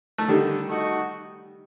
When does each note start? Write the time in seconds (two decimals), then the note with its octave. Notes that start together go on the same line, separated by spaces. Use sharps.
0.18 A3
0.28 D3 D#3 G3
0.69 A3 D#4 F#4